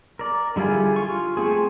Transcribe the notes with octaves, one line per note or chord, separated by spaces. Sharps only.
A#4 D5
D3 G3 E4 F4 G#4
F4 C#6
A3 C4 G#4